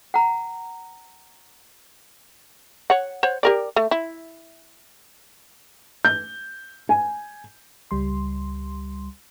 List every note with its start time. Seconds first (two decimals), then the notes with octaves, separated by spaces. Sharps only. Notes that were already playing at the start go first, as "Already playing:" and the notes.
0.14 F#5 A#5
2.90 C#5 F#5
3.23 C5 C#5 F#5
3.43 G4 A#4 D5
3.76 A3
3.91 E4
6.05 G6
6.89 G#5
7.91 C#2 G3 C6